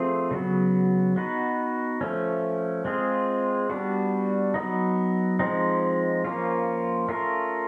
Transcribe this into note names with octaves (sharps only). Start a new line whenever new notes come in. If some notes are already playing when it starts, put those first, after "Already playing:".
Already playing: F3 A3 C4 F4 G#4
C#3 F#3 B3
B3 D#4 F#4 B4
F3 A3 C#4
G#3 C4 F4 G#4
G3 B3 D4 F#4
F#3 B3 D#4
F3 G#3 C4 D#4
F3 A#3 C#4 F4
A3 C#4 F4 A#4